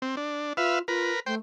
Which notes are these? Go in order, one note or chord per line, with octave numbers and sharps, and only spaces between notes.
C4
D4
F4 B4 E5 F5
F4 A#4 B4
A3 C5 G5